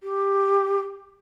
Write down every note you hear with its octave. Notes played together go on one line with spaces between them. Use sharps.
G4